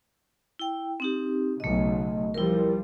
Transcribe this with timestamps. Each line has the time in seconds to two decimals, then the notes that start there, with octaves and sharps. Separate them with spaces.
0.59 E4 G5
1.00 C4 D#4 G4
1.60 B1 C#3 A3 D#5
2.34 F3 G3 E4 A#4